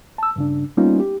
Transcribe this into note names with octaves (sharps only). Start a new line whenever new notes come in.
A5 E6
G2 C#3 D4
G3 A#3 B3 C#4 D#4 F4
G4